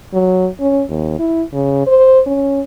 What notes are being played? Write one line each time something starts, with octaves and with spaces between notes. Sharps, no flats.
F#3
C#4
D#2
E4
C#3
C5
C#4